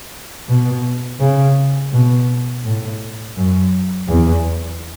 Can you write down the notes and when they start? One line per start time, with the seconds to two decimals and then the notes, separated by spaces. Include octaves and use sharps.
0.48 B2
1.20 C#3
1.92 B2
2.65 A2
3.37 F#2
4.08 E2